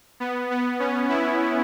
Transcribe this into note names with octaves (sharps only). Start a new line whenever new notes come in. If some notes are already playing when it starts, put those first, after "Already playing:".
B3
B3
C#4
E4